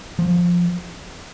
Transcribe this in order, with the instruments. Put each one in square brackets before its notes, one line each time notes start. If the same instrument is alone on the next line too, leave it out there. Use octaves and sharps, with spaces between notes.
[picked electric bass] F3